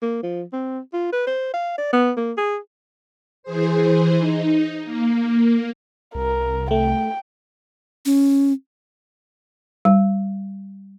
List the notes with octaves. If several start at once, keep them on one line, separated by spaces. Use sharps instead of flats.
A#3
F3
C4
F4
B4
C5
F5
D5
B3
A#3
G#4
E3 G#4 C5
D#4
A#3
C2 A#4
A3 G5
C#4
G3